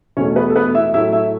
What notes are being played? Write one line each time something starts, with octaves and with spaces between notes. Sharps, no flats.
E2 B2 A3 C#4 C#5
B3 B4
A4
B3 B4
E4 E5
A2 F#3 A3 E4 E5
E4 E5